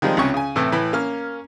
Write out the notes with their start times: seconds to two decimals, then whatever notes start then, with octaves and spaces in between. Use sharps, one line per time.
0.02 D#3 F3 G3 G#3 C4
0.17 C#2 C3 C#4 C#6
0.34 C#3 G#5
0.56 A2 C3 E3 A3
0.72 A2 E3 B5
0.93 A#3 C#4 F6